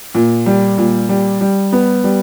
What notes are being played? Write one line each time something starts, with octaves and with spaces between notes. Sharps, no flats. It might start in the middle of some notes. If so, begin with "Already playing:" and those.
A#2
G3
A#2
G3
G3
B3
G3